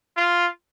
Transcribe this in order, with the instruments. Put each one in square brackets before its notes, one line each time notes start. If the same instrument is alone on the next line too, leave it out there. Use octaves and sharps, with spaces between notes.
[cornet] F4